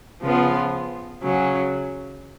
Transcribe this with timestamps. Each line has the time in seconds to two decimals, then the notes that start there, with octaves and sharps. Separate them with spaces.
0.21 C#3 F3 B3 F4
1.22 C#3 F#3 C#4